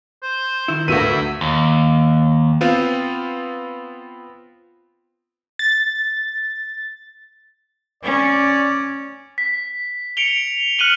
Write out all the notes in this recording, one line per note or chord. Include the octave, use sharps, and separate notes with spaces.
C5
D#3 E4
D2 B3 F#4 A#4 E5 D#7
D#2
B3 C4 F4
A6
C#4 D5
B6
C#7 D7 F7 G7
F6 F#6 C#7 D#7 F#7 G7